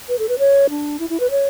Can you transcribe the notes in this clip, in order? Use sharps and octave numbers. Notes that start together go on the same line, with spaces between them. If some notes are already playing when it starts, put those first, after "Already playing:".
B4
A4
B4
C#5
D4
E4
E4
B4
C#5